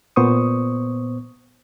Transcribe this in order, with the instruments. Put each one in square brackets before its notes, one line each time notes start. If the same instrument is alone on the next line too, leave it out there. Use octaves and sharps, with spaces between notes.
[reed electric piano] A#2 B3 C5 C#6 D#6